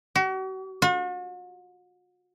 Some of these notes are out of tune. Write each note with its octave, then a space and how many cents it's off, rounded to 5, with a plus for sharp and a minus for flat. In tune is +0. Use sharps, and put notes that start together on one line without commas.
F#4 +40
F#4 -45